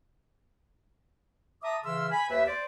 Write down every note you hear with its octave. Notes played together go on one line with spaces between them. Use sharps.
E5 A5 A#5 D6 D#6
C#3 E3 E5 C6 E6 F6
G#5 B5
D#2 B4 E5
C5 D5